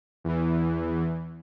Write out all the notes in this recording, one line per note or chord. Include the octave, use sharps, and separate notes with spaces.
E2 E3